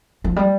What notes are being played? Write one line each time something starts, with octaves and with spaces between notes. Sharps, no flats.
F3
G3